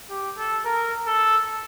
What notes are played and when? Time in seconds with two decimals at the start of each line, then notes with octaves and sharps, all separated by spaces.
0.09 G4
0.38 A4
0.65 A#4
1.07 A4